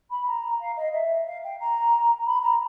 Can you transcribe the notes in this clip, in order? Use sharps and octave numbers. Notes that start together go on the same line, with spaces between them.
B5
A#5
F5
D#5
E5
F5
G5
A#5
B5
A#5